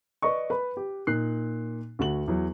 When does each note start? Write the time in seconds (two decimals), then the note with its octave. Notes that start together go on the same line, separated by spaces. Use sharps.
0.22 B4 D5 D#5 C#6
0.50 B4 B5
0.77 G4
1.07 A#2 D#4 F#6 C7
1.99 D2 F#4 F#7
2.28 E2 F#3